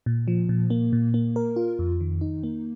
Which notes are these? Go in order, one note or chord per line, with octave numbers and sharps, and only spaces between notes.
A#2
F3
A#2
A#3
A#2
A#3
A#4
F4
F2
D#3
D#4
A#3